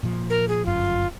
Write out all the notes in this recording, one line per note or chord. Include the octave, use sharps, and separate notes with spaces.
A#2 F3
A#4
G#4
G1 F#2 F4